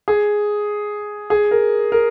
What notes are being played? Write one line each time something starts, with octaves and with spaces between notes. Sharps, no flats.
G#4
G#4
A#4
A#4